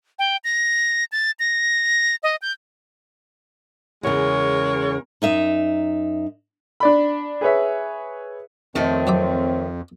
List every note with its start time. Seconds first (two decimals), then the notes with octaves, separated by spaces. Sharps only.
0.19 G5
0.44 A#6
1.12 A6
1.39 A#6
2.23 D#5
2.42 G6
4.03 E2 C#3 G#3 A#4 C#5
5.22 F#2 D#4 E5
6.80 D4 D5 B5
7.41 G#4 B4 C#5 E5
8.76 F2 B2 D#3 A3 C4 C#5
9.07 F#3 E5 D6